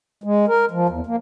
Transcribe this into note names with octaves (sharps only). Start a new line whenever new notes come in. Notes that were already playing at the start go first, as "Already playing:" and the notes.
G#3
A#4
F3
E2
A#3